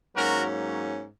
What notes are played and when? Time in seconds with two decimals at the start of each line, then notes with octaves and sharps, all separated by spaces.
0.15 G#2 F#3 A#3 C#4 F#4 A#4